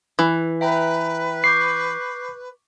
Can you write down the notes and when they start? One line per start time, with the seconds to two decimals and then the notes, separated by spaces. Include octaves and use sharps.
0.19 E3
0.61 B4 E5 G5 A#5
1.44 C#6 D6 G6 C7